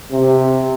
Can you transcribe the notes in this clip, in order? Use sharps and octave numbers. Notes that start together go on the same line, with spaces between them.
C3